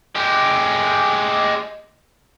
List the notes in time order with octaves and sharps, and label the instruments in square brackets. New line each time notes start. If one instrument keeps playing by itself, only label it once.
[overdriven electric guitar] G#3 G4